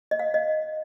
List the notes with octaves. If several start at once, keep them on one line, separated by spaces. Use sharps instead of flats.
D#5
F5
D#5